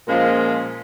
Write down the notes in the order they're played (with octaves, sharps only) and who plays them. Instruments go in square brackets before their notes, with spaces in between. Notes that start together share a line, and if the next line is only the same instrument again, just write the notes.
[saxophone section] A#2 F3 G#3 C#4 F4